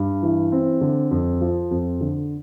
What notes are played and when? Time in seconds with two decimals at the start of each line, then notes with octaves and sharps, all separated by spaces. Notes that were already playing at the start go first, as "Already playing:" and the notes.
Already playing: G2
0.23 E3
0.52 C4
0.81 D3
1.11 F2
1.41 F3
1.71 F2
2.01 D3